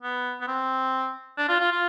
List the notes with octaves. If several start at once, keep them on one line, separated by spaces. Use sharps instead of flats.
B3
B3
C4
D4
F4
F4
F4